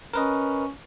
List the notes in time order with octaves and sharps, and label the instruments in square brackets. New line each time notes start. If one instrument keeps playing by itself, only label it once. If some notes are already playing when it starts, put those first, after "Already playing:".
[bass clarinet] C#4 [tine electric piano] A#4 B4 D#5